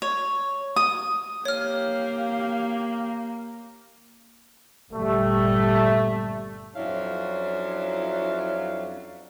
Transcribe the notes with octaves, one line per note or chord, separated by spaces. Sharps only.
C#5
D#6
A#3 G4 C#5 F5 F6
G1 A#2 G3 A3
F2 F#3 C#4 D4 E4 F5